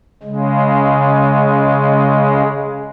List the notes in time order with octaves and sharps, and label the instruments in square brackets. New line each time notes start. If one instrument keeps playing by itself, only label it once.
[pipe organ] C#3 G#3